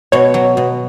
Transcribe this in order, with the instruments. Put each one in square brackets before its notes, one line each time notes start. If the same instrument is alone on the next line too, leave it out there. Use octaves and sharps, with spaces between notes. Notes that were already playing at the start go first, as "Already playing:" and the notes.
[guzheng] B2 [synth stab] C#5
[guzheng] F#3
B2